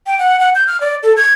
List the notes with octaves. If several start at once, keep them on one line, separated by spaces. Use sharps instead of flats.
G5
F#5
F#5
G6
F6
D5
A4
G#6